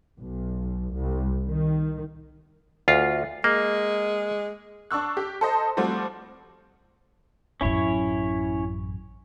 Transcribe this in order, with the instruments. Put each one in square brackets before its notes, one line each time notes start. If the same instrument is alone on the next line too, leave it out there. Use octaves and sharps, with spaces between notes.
[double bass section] B1
C2
D#3
[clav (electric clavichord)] D2 F4
[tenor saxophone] G#3 [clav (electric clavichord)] A#3
[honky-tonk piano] D4 C#6 E6 F#6
G4
A4 C5 D#5
F3 G3 A3 C4 F#4
[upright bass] A1 F#2 [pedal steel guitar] C#4 E4 C#5